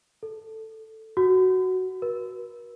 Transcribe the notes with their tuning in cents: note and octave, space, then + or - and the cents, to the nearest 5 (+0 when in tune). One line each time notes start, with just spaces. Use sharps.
A4 +5
F#4 +5
A#4 +45